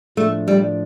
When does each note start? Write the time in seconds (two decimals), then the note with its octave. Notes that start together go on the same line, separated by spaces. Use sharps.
0.17 A2 F3 A3 D4
0.48 G3